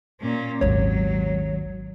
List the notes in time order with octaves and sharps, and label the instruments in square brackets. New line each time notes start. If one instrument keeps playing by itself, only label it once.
[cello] A#2 C#4
[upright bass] G#1 D#2 [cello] F#3 [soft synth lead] C#5